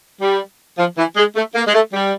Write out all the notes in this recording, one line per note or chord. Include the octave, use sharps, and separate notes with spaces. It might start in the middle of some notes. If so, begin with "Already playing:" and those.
G3
F3
E3
G#3
A3
A#3
G#3
A3
G3